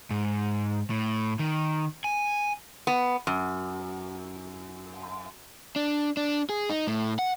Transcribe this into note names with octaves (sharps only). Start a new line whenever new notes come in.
G#2
A2
D#3
G#5
B3
F#2
D4
D4
G#4
D#4
A2
F#5